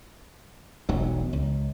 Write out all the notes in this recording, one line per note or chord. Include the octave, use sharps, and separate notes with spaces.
E1 B1 F#3
C#2